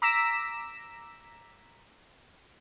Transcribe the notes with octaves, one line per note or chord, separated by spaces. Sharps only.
A#5 D6 E6 A#6 B6 E7